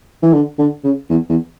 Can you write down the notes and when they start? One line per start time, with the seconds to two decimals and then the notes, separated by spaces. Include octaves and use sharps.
0.23 E3
0.33 D3
0.58 D3
0.84 C#3
1.10 E2
1.29 E2